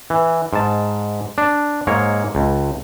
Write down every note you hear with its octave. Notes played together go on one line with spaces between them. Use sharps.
E3
G#2 A5
D4
G#2 A#3 C#5
C#2